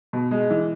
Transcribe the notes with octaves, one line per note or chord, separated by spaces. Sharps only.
B2
G#3
E3